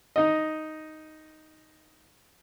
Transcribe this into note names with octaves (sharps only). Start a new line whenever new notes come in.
D#4 D#5